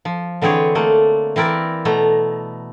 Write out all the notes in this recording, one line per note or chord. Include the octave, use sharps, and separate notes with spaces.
F3
D3 E3 C4 G#4 C#5
A3 A#3
E3 C4 E4 A#4 D5
B2 A3 A#5